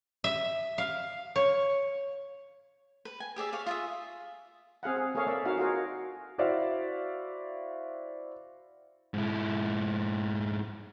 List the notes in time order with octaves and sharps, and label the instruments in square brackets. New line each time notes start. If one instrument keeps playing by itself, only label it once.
[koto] E5
F5
C#5
[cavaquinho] B4
G#5
G4 G#4 D5 E5
G#4 C#5 D5 F5
F4 G#4 E5
[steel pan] C4 G#4 F5 F#5
G#4
A#3 G#4 A4 C#5 F5
A#3 D5 E5
D#4 F#4 F5
F4 F#4 G#4 A#4
[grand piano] E4 F#4 C5 D5 E5 F5
[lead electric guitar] G#2 E4